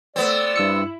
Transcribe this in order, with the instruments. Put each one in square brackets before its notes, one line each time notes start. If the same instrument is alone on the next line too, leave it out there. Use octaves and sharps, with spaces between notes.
[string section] A3 E6 [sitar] B3 C4 [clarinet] D5
[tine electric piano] G2 E6 C#7 [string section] E4